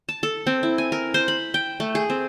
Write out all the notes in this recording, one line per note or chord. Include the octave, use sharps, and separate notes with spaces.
A5
A4
C4
E4
G#5
A#4
C5
B5
G5
A3
G#4
C4